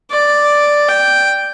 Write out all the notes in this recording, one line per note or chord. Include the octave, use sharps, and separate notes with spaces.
D5
G5